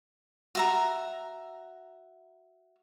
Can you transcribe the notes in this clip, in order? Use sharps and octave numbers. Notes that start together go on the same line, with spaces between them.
F#4 E5 A#5